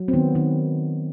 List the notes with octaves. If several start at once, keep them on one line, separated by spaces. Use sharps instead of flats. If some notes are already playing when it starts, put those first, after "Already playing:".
Already playing: F#3
C4
D#3 B3
D#3